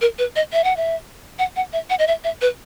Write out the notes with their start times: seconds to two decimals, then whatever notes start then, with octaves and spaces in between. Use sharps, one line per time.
0.01 A#4
0.18 B4
0.36 D#5
0.53 E5
0.64 F#5
0.77 E5
1.39 F#5
1.56 F#5
1.73 E5
1.90 F#5
1.99 D#5
2.07 E5
2.24 E5
2.41 B4